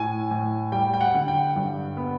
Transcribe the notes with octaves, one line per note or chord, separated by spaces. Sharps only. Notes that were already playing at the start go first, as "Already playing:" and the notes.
Already playing: A2 G#5
A2
G3 G5
G5
F#5
D3
G5
G2
B3